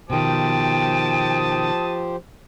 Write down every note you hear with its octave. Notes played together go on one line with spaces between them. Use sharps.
B2 D#3 F3 G4 C5 G5 A5 D#6